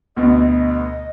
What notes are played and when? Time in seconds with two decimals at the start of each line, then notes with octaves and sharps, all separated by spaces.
0.16 D2 B2 D#5
0.64 D#5